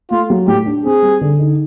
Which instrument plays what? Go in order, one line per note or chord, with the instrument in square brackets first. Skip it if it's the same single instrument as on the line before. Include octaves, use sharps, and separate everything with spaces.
[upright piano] A3 [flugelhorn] F4
[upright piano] F#3
[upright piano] A2 [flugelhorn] G4
[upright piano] D4
[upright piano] C4 [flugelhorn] G#4
[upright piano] G3
D3
D#4